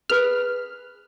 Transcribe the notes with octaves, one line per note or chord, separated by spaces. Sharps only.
G#4 B4 F6